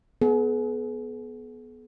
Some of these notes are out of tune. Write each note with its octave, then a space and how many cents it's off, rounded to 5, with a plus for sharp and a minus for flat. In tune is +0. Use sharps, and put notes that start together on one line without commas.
B3 +0 G#4 +40